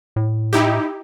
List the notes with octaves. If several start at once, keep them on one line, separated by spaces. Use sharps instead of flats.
A2
D#4 E4 G4